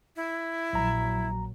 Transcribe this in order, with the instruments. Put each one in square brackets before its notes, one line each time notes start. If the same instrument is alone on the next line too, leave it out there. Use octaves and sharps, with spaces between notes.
[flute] E4
[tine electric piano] A#1 A#5 [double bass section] A#2 F#3